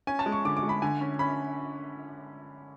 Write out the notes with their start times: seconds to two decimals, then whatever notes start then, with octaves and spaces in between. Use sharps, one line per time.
0.07 C#4 G#5
0.19 A5
0.26 G#3
0.32 C#6
0.45 D3 D6
0.57 D6
0.63 G#3
0.69 B5
0.82 D3 G#5
1.01 C#4
1.19 C#4 B5